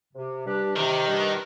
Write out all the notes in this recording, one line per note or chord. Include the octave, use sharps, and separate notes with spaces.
C3
G3 D4 G4 B4
C3 D#3
G3 D4 G4 B4